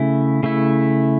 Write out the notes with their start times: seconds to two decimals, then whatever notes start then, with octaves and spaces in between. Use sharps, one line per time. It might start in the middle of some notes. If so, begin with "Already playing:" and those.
Already playing: C#3 A3 E4
0.43 C#3 A3 E4